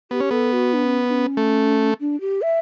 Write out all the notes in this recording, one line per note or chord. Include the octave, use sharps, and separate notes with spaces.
B3 G4
C#4
B3 A4
F#4
D4
C#4
D4
C#4
A3
D4
G4
E5